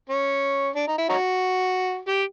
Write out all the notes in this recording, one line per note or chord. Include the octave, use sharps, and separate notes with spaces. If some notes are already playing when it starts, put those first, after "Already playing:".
C#4
D4
D#4
E4
C#4 D#4 F#4
G4